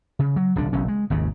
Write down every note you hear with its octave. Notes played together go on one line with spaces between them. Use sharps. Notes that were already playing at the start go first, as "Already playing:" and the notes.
C#3
F#3
D#1 C2 D3 D4
F#1 B1 C#4
G#3
G#1 D#2 C#3